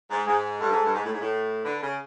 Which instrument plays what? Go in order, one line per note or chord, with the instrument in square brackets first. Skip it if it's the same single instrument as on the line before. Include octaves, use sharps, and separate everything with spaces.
[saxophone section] G#2
[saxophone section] G#2 [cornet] G#4
[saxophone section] G2 [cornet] A4
[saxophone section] G#2
G2
G#2
A2
G#2
A2
[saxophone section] D3 [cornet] B4
[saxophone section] C#3